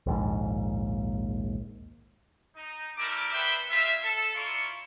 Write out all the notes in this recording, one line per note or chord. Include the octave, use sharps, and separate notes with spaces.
A#1 D#2 G#2
D#4
G3 A3 E4 A#4 D6
B3 D4 B4 C5 E5 G5
G3 F4 G#4 E5
A4
A#3 E4 F4 D5 C#6